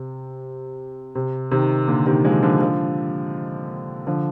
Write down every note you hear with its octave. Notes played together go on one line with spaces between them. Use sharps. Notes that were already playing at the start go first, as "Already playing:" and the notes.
Already playing: C3
C3
C3 D#3
A#2 D3
C3 D#3
F3 G#3
D3 F3
D3 F3
D3 F3